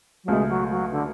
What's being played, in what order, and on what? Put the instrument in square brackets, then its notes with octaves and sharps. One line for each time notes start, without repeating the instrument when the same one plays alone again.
[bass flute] F#3
[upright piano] C#2 B2 A3 [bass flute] G#3
[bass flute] F#3
F#3
D3